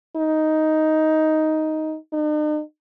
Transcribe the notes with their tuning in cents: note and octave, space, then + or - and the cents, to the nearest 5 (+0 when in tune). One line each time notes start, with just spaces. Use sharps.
D#4 +5
D#4 -45